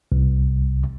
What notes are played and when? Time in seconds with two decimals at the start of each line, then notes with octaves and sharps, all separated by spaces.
0.12 C2